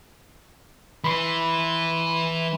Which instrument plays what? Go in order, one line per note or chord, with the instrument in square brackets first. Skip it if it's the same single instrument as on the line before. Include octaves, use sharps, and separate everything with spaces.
[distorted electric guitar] E3 [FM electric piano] B5 C6